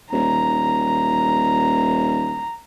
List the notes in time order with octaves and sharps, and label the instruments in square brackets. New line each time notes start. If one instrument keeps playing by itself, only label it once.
[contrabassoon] D#1 [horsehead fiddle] A#5